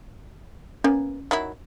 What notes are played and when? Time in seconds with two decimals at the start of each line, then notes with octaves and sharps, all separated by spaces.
0.84 A#3 B3 C#4
1.31 D#3 F#3 E4